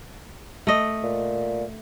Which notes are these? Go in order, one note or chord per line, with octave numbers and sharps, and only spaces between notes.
A3 D#5
A#2